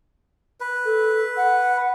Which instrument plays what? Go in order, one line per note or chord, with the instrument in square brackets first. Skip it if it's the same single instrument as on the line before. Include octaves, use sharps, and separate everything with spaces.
[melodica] B4
[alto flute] A4
F#5